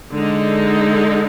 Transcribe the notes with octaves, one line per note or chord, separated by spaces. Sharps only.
D3 G#3 D#4